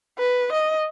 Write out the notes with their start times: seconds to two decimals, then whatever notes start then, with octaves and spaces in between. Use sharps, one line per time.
0.18 B4
0.53 D#5